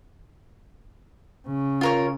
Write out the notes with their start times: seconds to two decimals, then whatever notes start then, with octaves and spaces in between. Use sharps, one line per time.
1.47 C#3
1.81 F4 A#4 C#5